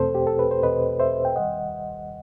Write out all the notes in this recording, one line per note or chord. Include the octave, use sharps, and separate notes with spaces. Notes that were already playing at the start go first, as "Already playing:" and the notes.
Already playing: E2 B2 A3 C4 A4 C5
G4
A4
B4
C5
E2 B2 A3 C4 B4 D#5
C5 E5
G5
D#2 D#3 G3 D#5 F#5